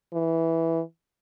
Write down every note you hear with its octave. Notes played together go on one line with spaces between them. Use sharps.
E3